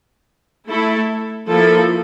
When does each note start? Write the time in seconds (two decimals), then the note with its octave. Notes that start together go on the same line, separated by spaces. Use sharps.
0.70 A3 E4 A4
1.50 F3 A#3 E4 A4